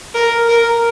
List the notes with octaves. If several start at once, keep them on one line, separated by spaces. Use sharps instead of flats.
A#4
A#4